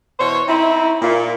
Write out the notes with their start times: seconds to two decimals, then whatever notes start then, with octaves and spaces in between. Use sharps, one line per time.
0.19 B2 E3 C5 C#5
0.48 C4 D#4 E4
1.02 A#2